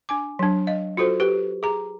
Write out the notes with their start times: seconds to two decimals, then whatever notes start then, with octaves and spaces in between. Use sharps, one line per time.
0.09 D4 G#5 D6
0.39 F#3 D4
0.67 D#5 F5
0.97 F4 F#4 A4 C5
1.20 G4 B4
1.63 G#4 A#5